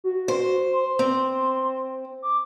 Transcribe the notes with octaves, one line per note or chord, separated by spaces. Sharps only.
F#4
C5
C6
C4
D6